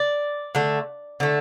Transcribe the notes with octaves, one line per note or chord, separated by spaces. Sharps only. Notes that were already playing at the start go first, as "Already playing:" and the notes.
Already playing: D5
D3 A3
D3 A3